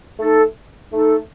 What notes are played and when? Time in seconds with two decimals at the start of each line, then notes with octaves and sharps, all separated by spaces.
0.18 A3 D#4 A4
0.92 A3 D#4 A4